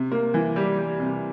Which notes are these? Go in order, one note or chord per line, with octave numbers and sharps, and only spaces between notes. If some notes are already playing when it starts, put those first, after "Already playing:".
Already playing: C3
A#3
E3
G3
G3
C3